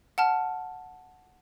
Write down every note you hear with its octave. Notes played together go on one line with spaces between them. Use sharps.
F#5 A5 F6